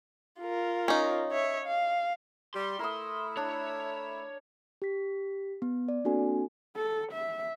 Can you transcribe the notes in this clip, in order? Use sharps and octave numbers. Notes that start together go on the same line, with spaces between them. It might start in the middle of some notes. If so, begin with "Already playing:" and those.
F4 A#4
C#4 D#4
C#5 E5
F5
G3 C6
A3 E4 A#4 D#6
D4 C#5
G4 B6
B3
D5
A#3 C4 D4 F#4 A4 G#5
A4
E5